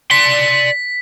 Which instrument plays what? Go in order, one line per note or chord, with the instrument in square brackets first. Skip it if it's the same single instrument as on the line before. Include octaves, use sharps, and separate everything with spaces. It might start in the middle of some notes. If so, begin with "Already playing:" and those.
[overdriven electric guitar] D5 C6 [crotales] B6